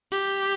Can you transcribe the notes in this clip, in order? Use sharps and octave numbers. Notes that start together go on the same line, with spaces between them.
G4